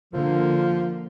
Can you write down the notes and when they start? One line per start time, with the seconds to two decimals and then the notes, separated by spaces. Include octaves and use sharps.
0.14 D3 F3 A#3